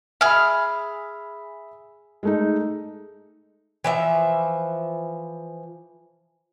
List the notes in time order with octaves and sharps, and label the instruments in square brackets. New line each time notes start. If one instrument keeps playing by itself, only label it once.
[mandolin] G#4 F6 [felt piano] E5 B5
[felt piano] G#3 A3 D#4
[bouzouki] E3 F3 E5